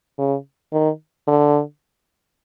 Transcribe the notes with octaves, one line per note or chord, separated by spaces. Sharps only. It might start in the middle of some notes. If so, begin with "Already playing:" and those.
C#3
D#3
D3